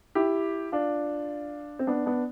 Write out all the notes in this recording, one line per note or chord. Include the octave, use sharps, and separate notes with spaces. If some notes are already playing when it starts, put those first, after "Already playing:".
E4 G4
D4 F4
C4
B3 D4
B3 D4